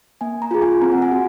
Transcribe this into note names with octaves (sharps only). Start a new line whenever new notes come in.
A#3 G#5
A#5
F4 G#4
G#5
C4 A#5
F#5
G#5
F#4